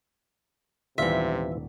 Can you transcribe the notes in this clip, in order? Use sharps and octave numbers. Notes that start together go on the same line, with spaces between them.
D#1 G#2 C3 E3 F4 D5 E5